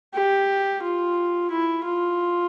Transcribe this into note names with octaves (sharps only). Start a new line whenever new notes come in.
G4
F4
E4
F4